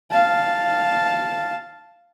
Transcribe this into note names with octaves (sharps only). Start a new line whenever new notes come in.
F5 A5